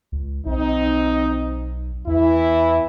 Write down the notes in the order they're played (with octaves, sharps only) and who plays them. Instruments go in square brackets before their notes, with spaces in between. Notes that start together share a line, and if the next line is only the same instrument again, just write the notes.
[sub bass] C#2
[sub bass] B1 [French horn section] C4 D#4
[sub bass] E2 [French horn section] E3 E4